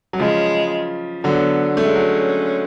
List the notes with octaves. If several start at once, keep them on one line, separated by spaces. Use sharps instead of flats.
F#3
C#3 F3 G#3
D3 F#3 B3
A3 C#4
G#3
F#3